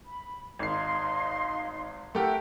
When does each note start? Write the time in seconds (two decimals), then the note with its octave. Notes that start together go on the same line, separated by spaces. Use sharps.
0.05 B5
0.59 G#1 D#4 F5 C6 C7
2.15 A3 G4 A#4 E5 F#5 G5